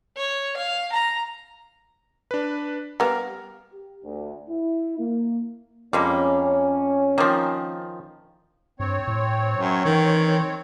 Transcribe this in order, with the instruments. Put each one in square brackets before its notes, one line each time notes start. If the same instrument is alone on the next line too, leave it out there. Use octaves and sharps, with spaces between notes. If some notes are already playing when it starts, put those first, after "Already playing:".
[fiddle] C#5
F5
A#5
[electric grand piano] D4 B4
[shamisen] G3 B3 G4 [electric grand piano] A#4 F5 A#5
[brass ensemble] G4
D2
E4
A#3
[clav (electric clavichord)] F2 [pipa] G3 G#3 A#3 [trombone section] C#4
[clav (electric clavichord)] D#3 F3 [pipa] A#3 C4
[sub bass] G2 [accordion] C4 C#5
[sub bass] A2
[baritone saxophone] F#2
[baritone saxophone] D#3 [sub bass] E3